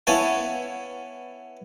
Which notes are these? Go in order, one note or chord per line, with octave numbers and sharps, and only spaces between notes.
B3 C#4 E4 F5 G#5 A5